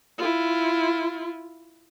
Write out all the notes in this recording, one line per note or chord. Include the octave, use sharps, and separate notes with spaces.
E4 F4